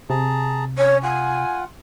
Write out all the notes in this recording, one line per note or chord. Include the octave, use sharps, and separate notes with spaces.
C3 G#4 A5 A#5
C#4 C#5
F4 F#5 G#5